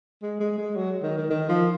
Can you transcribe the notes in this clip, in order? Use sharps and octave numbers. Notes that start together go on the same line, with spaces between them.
G#3
G#3
G#3
F#3
D#3
D#3
D#3
F3